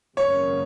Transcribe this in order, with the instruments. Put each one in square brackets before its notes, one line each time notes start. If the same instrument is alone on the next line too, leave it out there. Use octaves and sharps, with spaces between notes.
[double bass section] G#1 F#2 C#3 A#3 C#4 [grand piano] C#5